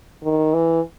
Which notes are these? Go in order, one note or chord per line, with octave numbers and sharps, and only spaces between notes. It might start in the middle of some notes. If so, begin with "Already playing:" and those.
D#3
E3